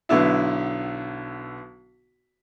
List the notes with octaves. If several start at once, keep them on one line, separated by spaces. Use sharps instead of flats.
B1 D3 B3 E4